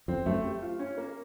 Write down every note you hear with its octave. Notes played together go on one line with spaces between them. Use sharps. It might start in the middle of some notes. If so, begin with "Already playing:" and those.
F2 C4
F#2 A3
G4
F4
C#4
A#3